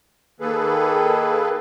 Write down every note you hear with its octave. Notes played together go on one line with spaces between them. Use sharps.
D#3 A#3 G#4 A4 B4